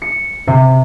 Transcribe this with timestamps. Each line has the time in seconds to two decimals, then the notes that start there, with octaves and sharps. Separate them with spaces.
0.02 C#7
0.47 C3